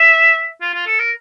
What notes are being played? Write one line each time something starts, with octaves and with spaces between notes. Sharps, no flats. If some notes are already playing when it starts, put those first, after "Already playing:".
Already playing: E5
F4
F4
A4
A#4